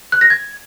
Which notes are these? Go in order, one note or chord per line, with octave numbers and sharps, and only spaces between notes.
F#6
A#6
G#6